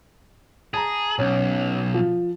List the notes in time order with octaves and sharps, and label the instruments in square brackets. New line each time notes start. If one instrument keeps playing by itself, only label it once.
[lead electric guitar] G#4 [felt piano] A5 A#5
[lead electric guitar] B1 [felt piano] C#4
[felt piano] F3